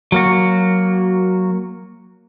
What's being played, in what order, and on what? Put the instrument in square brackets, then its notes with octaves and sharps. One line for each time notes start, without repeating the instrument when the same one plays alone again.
[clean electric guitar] F#3 A#3 F#4